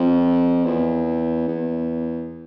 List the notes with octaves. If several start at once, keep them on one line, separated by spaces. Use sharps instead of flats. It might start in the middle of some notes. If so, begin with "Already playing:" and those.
Already playing: F2
E2
E2